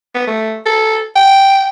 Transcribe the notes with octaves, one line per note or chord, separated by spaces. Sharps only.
B3
A3
A4
G5